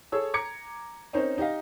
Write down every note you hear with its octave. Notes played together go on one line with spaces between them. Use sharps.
G#4 A4 C#5 E6
A#5 D6 G#6 C#7
C4 C#4 D#4 A#4 C5 C#5
D#4 G4 D#5 F5